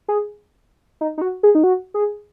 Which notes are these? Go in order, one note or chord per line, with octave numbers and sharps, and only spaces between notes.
G#4
D#4
D#4
F#4
G#4
D#4
F#4
G#4